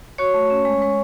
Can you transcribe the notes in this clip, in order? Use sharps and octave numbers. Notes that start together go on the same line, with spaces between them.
F#4 C#5 C#6
A3
C#4
G#3
G#3